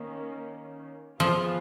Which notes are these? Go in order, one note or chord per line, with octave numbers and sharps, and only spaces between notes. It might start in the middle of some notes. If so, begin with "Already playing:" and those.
Already playing: D#3 A#3 C#4
F3 B3 F4 G#4 B4